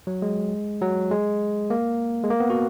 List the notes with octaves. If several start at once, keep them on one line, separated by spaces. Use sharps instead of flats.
F#3
G#3
F#3
G#3
A#3
G#3
A#3
B3
F#4